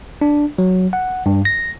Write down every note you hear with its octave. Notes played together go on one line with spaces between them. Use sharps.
D4
F#3
F#5
G2
A#6